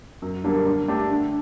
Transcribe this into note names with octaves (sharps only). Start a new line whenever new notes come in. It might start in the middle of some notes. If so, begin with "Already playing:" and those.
F#2
D3 G3 A#3 D4
D3
A3 D4 G4
D3